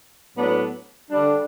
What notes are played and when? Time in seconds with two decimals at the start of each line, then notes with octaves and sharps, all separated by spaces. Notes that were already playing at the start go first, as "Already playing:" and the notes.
0.35 A2 F#3 B3 D4
1.10 D3 G3 D4